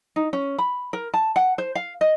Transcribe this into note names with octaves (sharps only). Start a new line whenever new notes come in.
D#4
C#4
B5
A#4
A5
F#5
C5
F5
D#5